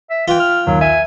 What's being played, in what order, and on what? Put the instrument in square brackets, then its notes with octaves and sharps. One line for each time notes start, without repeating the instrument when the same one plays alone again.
[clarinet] E5
[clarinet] E3 [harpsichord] F4 G5
[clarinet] F6
[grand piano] D#2 [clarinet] F#3
[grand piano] E5 [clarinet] G#5